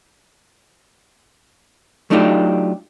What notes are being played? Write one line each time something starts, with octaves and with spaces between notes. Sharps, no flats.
F#3 A3 D4 D#4 F4 G4